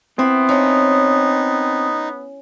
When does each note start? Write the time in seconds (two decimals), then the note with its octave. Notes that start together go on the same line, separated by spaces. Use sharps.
0.19 B3 C4 E4
0.49 C#4 D#4